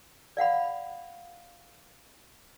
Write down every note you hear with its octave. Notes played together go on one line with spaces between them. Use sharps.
D5 F5 F#5 B5